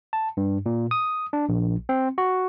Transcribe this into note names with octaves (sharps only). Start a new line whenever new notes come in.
A5
G2
A#2
D#6
D4
A#1
C4
F#4